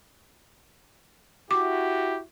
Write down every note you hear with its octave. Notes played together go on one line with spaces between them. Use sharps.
E4 F#4 G4 D6